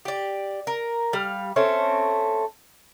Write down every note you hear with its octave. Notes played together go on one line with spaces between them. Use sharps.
G4 D5
A#4
G3 F5
A3 C4 C#4